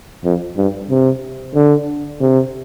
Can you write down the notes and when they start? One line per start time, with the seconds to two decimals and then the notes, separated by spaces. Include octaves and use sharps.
0.24 F2
0.57 G2
0.90 C3
1.55 D3
2.21 C3